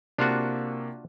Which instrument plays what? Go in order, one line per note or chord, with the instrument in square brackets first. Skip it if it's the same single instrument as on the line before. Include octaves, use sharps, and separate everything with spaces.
[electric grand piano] C3 A#3 C#6 [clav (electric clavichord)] D4 F4 F#4